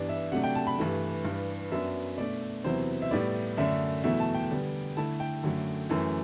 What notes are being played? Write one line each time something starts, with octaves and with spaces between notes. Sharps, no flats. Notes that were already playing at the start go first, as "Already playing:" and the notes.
Already playing: G2 E3 B3 D4 D5
E5
C3 F#3 A3 D4 F#5
G5
A5
B5
G2 E3 A3
G2 E3 G3
F#2 F#3 B3 D4 E5
B2 A3 D4 D5
E2 C3 F#3 B3 E4 C5
E5
A2 G3 B3 E4 D5
F#2 D3 A3 D4 E5
E2 B2 F#3 A3 E4 E5
A5
G5
D3 G3 B3
D3 A3 E4 A5
G5
F#2 D3 F#3 A3
F#2 E3 A3 E4